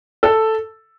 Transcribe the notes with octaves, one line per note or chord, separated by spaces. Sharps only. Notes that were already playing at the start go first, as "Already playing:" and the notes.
A4